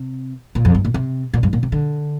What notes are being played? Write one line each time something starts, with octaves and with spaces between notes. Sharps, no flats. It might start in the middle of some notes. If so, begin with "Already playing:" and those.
Already playing: C3
A#2
F2
G2
A#2
C3
A#2
G2
A#2
C3
D3